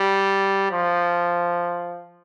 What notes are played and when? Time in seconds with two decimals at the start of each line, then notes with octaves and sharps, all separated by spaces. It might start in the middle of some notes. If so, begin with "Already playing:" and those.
Already playing: G3
0.71 F3